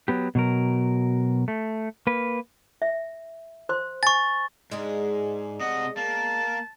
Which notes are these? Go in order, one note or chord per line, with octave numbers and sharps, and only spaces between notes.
F#3 B3 G4
B2 F#3 A#4
A3
A#3 B4
E5
C5 C6
G#5 C#6 A6
G#2 G#3 D4 G#4
C3 D#5 F#5
A#3 A5